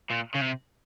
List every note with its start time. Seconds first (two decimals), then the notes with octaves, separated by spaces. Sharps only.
0.10 A#2
0.35 C#3
0.42 C3